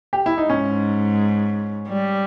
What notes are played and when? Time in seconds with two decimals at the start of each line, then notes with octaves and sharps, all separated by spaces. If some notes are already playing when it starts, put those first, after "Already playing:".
0.13 G4
0.26 E4
0.38 D#4
0.49 G#2 C#4
1.88 G3